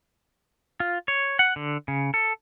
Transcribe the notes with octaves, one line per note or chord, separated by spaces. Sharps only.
F4
C#5
F#5
D3
C#3
A4